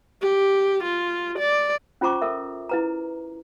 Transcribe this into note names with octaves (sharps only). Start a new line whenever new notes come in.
G4
F4
D5
C#4 F4 C5 A#5 C#6 D6
A4 A#4 E5
E4 B4 A#5